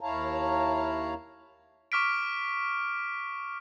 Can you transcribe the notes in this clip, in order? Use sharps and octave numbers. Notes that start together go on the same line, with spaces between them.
D#2 E4 C#5 F5 A5 A#5
C#6 D6 F6 B6 D7